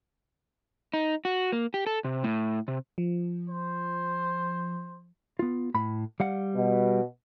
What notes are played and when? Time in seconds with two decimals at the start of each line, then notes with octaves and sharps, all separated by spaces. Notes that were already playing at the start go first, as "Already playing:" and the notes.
0.94 D#4
1.25 F#4
1.52 A#3
1.74 G4
1.87 A4
2.04 C3
2.24 A2
2.68 C3
2.98 F3
3.50 C5
5.39 B3 F4
5.74 A2 B5
6.20 G3 F5 F#5
6.55 B2